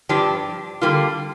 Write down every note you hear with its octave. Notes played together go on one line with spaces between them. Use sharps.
G2 F3 D4 G4
D3 G3 A#3 F4